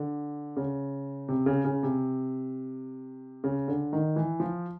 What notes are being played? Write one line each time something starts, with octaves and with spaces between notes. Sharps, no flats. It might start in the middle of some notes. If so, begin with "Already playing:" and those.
Already playing: D3
C#3
C3
C#3
C#3
C3
C#3
D3
D#3
E3
F3